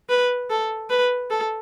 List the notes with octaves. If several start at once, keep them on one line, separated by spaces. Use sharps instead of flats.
B4
A4
B4
A4